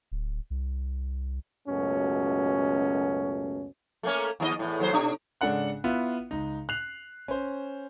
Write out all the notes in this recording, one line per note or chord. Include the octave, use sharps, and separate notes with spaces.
D1
C2
C#2 F#2 B2 A3 C#4
A3 A#3 C#4
D#2 D4 D#5
E2 A2
D#2 F#3 C5
B2 D4
G#2 C#3 D4 A4 F#5 F#6
B3 E4 F4
C#2 D#4
F#6 C7 F7
C#4 C5